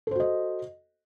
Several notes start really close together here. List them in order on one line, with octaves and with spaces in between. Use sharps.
A4 C5 F#4 D#5